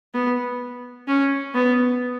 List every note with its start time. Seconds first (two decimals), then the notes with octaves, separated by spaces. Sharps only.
0.14 B3
1.08 C#4
1.54 B3